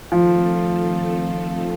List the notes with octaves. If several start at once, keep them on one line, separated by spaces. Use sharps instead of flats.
D#3 F3 A3 C4 F4 A4